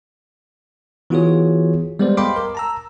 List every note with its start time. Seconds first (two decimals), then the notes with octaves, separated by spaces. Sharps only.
1.10 E3 B3 F4 F#4 G#4 C#5
1.99 G3 G#3 B3 A4 C5 D5
2.17 D#5 F5 G5 B5 C6 D6
2.36 A#4
2.55 A5 A#5 E6